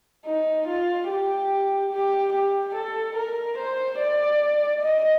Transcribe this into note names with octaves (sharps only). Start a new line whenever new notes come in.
D#4
F4
G4
G4
G4
A4
A#4
C5
D5
D#5